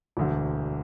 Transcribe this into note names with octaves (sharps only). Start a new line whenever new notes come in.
E1 D2 D3